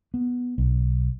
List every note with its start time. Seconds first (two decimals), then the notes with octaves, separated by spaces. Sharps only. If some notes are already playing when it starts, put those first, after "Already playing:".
0.14 B3
0.58 B1